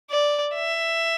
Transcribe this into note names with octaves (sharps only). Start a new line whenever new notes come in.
D5
E5